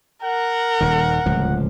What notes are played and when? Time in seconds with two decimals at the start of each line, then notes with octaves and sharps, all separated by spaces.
0.23 A#4 F#5
0.81 D#1 D#3
1.26 D1 C#2 F3